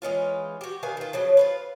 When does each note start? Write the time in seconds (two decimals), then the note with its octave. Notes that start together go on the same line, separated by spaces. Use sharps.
0.02 E3 G#3 C#4 F4
0.61 F#4 G4
0.83 D#3 B4 F5 G#5
0.97 D#3 F4
1.13 C#3 F3 F#3
1.37 F4 G#4 B4